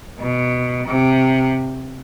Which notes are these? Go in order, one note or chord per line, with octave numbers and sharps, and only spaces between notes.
B2
C3